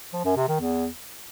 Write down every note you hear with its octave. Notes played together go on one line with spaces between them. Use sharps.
F3
F#2
C3
D#3
E2